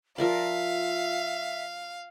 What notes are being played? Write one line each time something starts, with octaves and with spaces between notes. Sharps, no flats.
F3 F4 A#4 D5 E5 F5